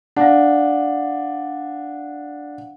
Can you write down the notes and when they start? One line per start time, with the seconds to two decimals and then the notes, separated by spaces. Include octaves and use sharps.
0.16 D4 F5 F#5